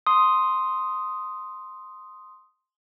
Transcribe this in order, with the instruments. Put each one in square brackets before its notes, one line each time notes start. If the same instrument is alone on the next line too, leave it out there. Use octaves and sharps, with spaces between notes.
[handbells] C6 D#6